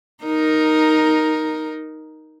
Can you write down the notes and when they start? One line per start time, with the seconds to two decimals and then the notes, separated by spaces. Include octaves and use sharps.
0.23 D#4 A#4